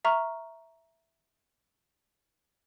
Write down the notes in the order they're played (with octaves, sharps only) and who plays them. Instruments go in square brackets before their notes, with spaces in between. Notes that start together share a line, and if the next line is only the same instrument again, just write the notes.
[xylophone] E5 A#5 C#6 F6